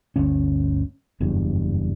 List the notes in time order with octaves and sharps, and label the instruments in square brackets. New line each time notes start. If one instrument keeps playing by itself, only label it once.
[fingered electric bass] G1 D2 C#4
F#1 E2 G2